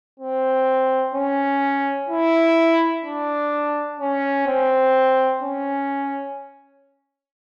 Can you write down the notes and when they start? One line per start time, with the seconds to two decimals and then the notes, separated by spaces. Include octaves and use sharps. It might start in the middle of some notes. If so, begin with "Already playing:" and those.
0.19 C4
1.14 C#4
2.09 E4
3.04 D4
3.99 C#4
4.47 C4
5.42 C#4